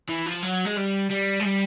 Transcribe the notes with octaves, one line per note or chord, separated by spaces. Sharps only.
E3
F3
F#3
G#3
G3
G3
G#3
G3